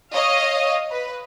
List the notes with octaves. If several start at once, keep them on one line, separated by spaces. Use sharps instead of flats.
C#5 D#5 F5
B4